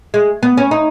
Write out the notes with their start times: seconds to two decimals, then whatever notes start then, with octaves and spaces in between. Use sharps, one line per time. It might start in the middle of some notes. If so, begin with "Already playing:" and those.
0.14 G#3
0.43 B3
0.57 C#4
0.71 D#4